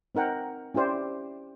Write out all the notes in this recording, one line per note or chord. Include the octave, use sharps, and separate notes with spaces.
C4 D#4 A#4 F#5 G5
C#4 E4 G4 C5 D5